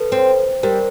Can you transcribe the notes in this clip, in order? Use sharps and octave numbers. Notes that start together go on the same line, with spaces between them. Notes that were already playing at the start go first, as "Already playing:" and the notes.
Already playing: A4 B4
C4
G3 A#4 C5